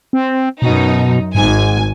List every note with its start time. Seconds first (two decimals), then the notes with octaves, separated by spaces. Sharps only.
0.13 C4
0.62 F#2 B2 D#4
1.35 G#1 G#2 G#5